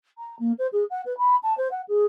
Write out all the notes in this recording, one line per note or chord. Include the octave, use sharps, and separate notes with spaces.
A#5
A#3
C5
G#4
F#5
B4
B5
A5
C5
F#5
G#4